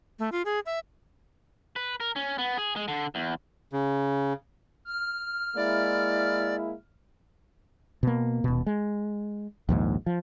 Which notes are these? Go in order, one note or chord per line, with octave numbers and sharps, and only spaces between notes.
A3
F4
G#4
E5
B4
A#4
C#4
B3
G#4
G#3
D3
E2
C#3
F6
G#3 A#3 E4 D5
B2 A#3
D#1 B2
G#3
A#1 D#2 G#2
F3